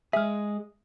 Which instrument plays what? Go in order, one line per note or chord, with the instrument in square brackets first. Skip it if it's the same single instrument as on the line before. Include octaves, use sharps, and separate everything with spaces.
[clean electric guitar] G#3 G#4 [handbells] E5 F6